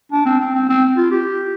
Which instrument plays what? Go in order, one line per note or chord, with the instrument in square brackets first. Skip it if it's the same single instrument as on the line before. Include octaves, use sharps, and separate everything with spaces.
[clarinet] D4
C4
C4
C4
C4
F4
G4